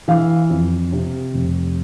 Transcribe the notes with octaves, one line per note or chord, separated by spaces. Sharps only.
E3 F5
F2
C3
F1